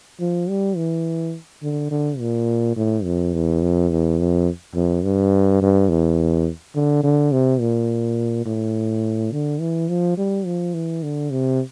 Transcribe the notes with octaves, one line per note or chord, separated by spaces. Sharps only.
F3
G3
E3
D3
D3
A#2
A2
F2
E2
F2
E2
F2
F2
G2
G2
E2
D3
D3
C3
A#2
A2
D3
E3
F3
G3
F3
E3
D3
C3